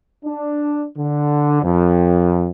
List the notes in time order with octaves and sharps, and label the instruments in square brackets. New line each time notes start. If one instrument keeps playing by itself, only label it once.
[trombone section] D4
D3
F2